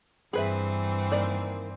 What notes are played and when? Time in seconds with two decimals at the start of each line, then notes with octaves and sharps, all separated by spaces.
0.33 G2 E3 C4 G#4 B4 E5
1.12 D#3 A#3 D5